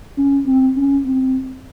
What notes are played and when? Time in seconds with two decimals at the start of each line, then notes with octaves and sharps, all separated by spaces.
0.18 C#4
0.47 C4
0.77 C#4
1.06 C4